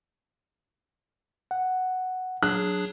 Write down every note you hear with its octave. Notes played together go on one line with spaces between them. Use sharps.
F#5
F#3 D4 G#4 F#6